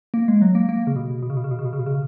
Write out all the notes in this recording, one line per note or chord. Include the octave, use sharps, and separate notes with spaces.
A#3
G#3
F#3
A#3
A#3
C#3
B2
B2
C#3
B2
C#3
B2
C#3
B2
C#3
B2
C#3